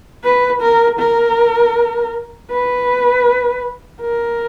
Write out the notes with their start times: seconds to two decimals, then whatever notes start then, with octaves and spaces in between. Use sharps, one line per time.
0.24 B4
0.61 A#4
1.00 A#4
2.50 B4
4.01 A#4